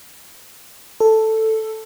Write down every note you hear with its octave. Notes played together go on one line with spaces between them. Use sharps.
A4